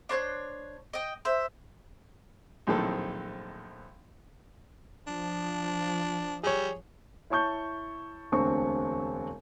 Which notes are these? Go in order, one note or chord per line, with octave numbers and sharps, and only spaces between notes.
D4 C5 C#5 F#6
D#5 G5
C5 E5
A#1 F#2 A2 D#3 C4 A4
F3 D4
G3 G#4 C#5
E4 C#5 A5 C#6 G6
E1 D2 C4 D4 C#6